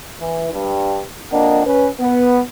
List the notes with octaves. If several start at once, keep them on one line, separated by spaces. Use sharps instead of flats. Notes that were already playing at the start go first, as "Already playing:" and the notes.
E3
G2
F2 A#3 D4 D#5 F#5
C#4 B4
B3